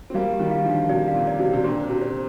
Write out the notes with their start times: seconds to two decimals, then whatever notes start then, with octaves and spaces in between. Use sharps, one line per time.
0.10 C4
0.14 G3 A#3 F5
0.33 G4
0.39 D#3 G3
0.51 D#3 F5
0.64 D3 F3
0.71 F5
0.89 C3 D5
1.08 F5
1.14 A#2
1.27 D5
1.39 C3
1.45 D5
1.53 C3
1.64 A#2 D3 C5
1.83 C5
1.89 C3
2.02 C5